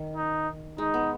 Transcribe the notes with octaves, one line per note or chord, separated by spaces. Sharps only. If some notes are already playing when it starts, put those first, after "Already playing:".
Already playing: D#3
D#4
G#3 D#4
B3